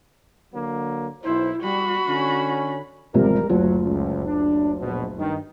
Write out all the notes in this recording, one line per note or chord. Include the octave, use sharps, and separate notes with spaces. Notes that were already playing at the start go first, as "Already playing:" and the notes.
D3 F#3 A#3
B1 E4 C5
G3 F#4 B5
D3 C#4
G#1 E2 C3 F3 G3 A#4
F#1 D2 F#3 F4
C#2
D4
A#1 B2
G2 D#3